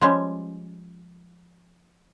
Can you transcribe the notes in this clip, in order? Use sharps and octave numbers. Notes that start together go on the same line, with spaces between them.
F3 G3 G#3 C#4